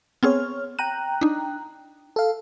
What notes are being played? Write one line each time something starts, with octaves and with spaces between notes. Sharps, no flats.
B3 C4 G#4 C#5 F6
G5 A#5 F#6 D#7
D4 D#4
A4 F5